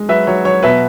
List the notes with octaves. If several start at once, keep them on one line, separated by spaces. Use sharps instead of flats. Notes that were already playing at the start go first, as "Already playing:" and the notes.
Already playing: G#3
F#3 B4 E5
F#3 C#5
F#3 C#5
B2 B4 E5